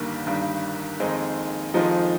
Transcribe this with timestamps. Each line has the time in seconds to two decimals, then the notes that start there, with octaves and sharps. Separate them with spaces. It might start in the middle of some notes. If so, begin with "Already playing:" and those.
Already playing: G1 G2 D#3 G3 A#3
0.26 G1 G2 D#3 G3
1.00 F2 D#3 G#3 C4 D#4
1.74 F2 D#3 F3 G#3 C4 D#4